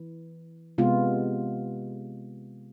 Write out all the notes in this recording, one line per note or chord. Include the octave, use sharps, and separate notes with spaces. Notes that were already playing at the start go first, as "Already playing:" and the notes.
Already playing: E3
C3 G#3 B3 F4